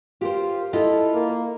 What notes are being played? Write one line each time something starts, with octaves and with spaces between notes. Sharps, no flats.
F4 G4 A#4 C5
E4 F4 A4 D#5
A#3